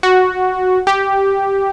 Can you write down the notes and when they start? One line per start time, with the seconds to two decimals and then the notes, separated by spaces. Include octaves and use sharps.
0.03 F#4
0.87 G4